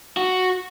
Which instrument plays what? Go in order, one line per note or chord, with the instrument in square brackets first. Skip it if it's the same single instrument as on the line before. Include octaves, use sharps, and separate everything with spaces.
[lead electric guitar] F#4